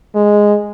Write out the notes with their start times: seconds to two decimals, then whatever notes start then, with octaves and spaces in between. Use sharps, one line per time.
0.15 G#3